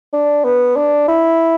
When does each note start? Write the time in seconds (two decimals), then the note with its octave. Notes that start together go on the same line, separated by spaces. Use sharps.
0.13 D4
0.44 B3
0.76 D4
1.08 E4